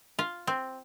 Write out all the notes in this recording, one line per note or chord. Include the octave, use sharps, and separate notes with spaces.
F4
C4